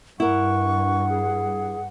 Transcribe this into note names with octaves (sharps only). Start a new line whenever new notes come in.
G2 E4 A#4 F#5 C#6
G#4